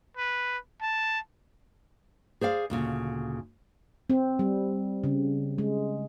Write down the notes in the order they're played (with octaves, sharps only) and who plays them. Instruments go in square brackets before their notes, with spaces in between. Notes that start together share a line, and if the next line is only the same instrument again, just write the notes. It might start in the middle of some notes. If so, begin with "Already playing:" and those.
[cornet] B4
A5
[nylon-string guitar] G#4 C5 D5 F5
D2 A#2 C#3
[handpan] C4
G3
C#3
G#3